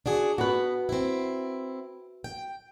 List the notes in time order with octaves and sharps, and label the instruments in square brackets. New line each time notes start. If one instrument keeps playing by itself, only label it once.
[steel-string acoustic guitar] D4 F#4 G#4
[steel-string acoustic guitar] B3 [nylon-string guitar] F#4 B4
[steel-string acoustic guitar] C4 E4
G5